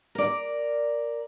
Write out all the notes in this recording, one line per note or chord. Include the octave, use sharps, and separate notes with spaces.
A#4 D5